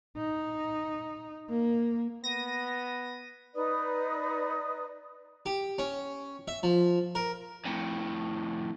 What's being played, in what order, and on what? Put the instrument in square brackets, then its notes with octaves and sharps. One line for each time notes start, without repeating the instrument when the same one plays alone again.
[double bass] D#4
A#3
[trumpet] B3 [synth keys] A#6 D#7
[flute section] D#4 B4 D5 D#6
[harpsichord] G4
C#4
E5
F3
A#4
[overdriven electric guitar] F2 A2